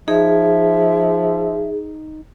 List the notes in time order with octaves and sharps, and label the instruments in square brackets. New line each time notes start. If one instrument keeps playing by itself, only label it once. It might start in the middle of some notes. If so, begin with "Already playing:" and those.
[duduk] F3 [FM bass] D#4 [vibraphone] G#4 [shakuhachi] E5